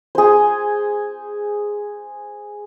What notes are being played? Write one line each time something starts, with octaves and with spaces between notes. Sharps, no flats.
G#4 C5